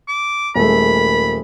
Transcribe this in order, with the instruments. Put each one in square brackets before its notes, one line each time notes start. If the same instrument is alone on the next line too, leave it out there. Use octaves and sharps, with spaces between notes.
[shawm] D6
[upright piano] D#1 G#3 A3 [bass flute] A#4 [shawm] B5